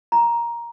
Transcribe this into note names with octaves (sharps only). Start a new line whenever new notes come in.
A#5